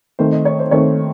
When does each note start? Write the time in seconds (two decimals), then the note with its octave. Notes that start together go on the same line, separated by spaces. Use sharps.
0.19 D#3 A3 C4 C5
0.33 D#5
0.45 C#5
0.59 C5
0.71 D#3 A3 C4 C#5